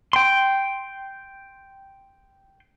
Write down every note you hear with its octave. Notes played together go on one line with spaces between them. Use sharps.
G5 C6